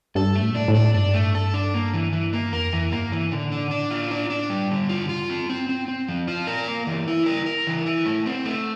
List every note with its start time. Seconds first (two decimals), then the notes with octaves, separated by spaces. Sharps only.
0.15 G2 A4
0.36 A3
0.42 A2
0.50 A#2
0.55 A2 D4
0.68 A2
0.74 D4
0.94 G2 D4
1.14 A3
1.35 A4
1.54 D4
1.74 A#3
1.93 E3
2.13 E3
2.33 A#3
2.53 F2 A#4
2.73 E3
2.92 G2 A#3
3.12 E3
3.32 A2 D3
3.52 D4
3.71 D4
3.90 F4
4.11 D4
4.30 D4
4.50 G3
4.71 D3
4.89 G2 F4
5.09 F4
5.30 C4
5.49 C4
5.69 C4
5.88 C4
6.08 F3
6.28 F4
6.47 A#4
6.68 A#3
6.87 E3
7.08 E4
7.26 A#4
7.46 A#4
7.67 E3
7.86 E4
8.06 F2 A3
8.26 C4
8.45 A3